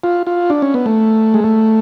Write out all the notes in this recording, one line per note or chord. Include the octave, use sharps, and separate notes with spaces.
F4
F4
D4
C#4
B3
A3
G#3
A3